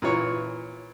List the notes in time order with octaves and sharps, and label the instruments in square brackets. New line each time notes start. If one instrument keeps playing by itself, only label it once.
[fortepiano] A#2 E3 C#5